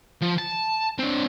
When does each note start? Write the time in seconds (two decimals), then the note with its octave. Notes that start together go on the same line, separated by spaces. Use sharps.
0.21 F3
0.38 A5
0.99 C4 D4